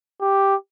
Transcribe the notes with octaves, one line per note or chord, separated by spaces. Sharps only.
G4